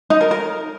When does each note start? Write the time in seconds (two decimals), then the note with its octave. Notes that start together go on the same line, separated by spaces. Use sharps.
0.10 D#4
0.21 A#4
0.31 A#4